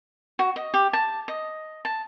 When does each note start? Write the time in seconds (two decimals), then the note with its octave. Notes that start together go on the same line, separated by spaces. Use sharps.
0.39 F#4
0.56 D#5
0.74 G4
0.93 A5
1.28 D#5
1.85 A5